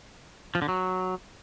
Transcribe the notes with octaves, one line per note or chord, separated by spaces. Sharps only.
F3
D3
F#3